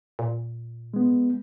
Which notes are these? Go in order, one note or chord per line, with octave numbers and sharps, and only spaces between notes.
A#2
G#3 B3